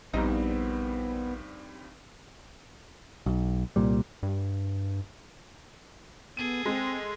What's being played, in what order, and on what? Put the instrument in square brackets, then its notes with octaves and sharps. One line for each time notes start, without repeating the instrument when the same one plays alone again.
[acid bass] A#1 [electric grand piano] G2 G3 C4 [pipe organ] B3 [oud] D#4
[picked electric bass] B1
C2 A#2 G3
[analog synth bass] G2
[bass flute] B3 [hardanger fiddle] G#4 A4 [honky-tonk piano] D#7
[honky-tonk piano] G#3 [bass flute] C4